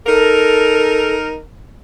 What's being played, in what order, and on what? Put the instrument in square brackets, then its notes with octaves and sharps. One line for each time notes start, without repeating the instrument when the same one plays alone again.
[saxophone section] D#4 A#4 [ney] A4